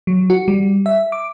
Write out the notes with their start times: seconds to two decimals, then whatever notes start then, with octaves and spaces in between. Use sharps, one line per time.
0.07 F#3
0.30 F#4
0.48 G3
0.86 E5
1.12 D6